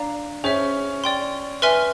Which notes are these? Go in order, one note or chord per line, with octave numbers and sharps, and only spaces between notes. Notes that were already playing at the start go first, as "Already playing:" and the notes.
Already playing: D4 D5 F5 A#5
C#4 G#4 C5 E5
D5 G5 C6
B4 E5 G#5 C6 F6